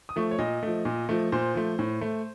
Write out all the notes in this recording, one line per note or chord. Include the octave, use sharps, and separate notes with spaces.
D#6
F3 A3 C#6
C#5
A#2 D#5
F3 A3
A#2
F3 A3
A#2 C5
F3 A3
A2
A3